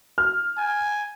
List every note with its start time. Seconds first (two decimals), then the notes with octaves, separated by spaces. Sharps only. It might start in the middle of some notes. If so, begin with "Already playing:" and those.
0.18 F6
0.58 G#5